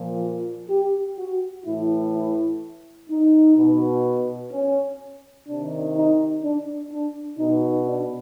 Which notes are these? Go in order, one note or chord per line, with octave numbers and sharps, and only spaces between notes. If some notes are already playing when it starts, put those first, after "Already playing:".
Already playing: A#2 F3
F4
G4
F#4
A2 E3 E4
E4
D#4
B2
C#4
C3 D#3 D4
D#4
D4
D4
B2 D#4
D4